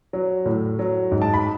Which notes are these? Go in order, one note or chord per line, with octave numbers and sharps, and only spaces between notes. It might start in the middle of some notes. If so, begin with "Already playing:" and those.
F#3
A2
F#3
G#2
A5
B5